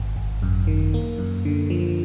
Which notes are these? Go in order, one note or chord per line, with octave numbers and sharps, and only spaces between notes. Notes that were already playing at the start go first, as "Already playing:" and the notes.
Already playing: G#1
G#1
F#2
D#3
A#3
F#2
D3
F3